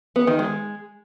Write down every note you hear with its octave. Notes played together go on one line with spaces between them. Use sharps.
B3
D#3
G#3